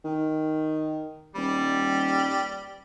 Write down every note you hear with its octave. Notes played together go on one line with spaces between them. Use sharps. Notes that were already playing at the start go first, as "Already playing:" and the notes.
D#3
D#1 G3